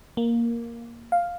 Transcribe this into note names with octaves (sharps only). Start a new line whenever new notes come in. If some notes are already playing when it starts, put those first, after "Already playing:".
A#3
F5